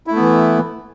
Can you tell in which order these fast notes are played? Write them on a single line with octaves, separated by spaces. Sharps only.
E4 A3 B3 E3